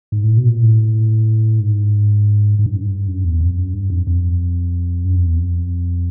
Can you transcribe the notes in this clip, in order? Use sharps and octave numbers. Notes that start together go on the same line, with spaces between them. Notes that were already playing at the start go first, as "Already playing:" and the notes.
G#2
A2
B2
A#2
A2
G#2
G#2
G2
F#2
G2
F#2
E2
F2
F#2
G2
F2
F2
F#2
F2
E2
F2